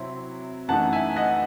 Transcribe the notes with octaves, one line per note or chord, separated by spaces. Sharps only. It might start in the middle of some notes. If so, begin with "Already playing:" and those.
Already playing: C3 F#3 C4 E4
F#2 E3 A3 D#4 F#5 A5
E5 G#5
D#5 F#5